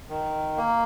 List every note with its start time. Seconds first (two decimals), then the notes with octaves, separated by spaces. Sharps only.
0.10 D#3
0.57 A#3